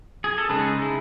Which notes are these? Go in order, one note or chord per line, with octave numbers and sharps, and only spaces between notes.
G#4
A4
C#3 G#3 D#4 G#4 B4
E4